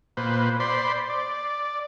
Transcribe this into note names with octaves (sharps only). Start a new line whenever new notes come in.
A#2 B4 C5
C5 D5 B5 C6
D5